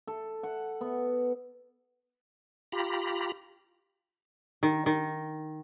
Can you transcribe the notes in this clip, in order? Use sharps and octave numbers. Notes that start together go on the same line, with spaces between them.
A4
F#5
B3
F4 G4 A#5 B5
D#3
D#3